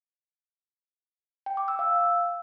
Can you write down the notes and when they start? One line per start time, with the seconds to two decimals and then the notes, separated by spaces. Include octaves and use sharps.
1.46 G5
1.57 D6
1.68 E6
1.79 F5